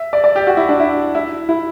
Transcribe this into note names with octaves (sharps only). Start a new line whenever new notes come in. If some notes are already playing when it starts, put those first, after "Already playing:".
Already playing: E5
D5
D5
G4
F#4
E4
D4
E4
E4
E4